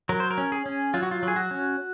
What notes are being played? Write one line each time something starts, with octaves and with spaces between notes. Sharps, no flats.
F#3 A#4
C5
A#4
C#4
G#4
C#4
F#3 F4
F#4
F4
F#3
G#4
F#4
C#4